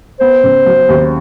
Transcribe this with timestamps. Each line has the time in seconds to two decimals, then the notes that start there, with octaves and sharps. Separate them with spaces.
0.20 B3 C5
0.44 C#3
0.66 F#3
0.89 D#2